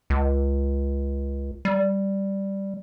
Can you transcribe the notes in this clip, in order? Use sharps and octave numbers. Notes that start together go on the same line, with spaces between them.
C#2
G3